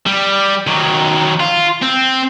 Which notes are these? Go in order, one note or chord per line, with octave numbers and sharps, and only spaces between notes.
G3
D#3 F#3
F4
C4